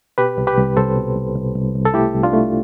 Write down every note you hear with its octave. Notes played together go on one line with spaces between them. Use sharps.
B2 G4 B4
C2
G4 B4
C2
C2 A4 C5
B2
C2
C2
C2
C2
A4
A3 E4 G4
C2
D4 F4
A3